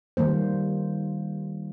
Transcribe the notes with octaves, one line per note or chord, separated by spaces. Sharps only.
D#3 G3 A#3 C5